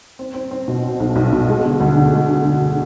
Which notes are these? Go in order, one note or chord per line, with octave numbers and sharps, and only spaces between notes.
C4
C4
C4
B2
C4
B1
B1
B2
G#3
D3
D2
D3
G#3
D3
D3
D3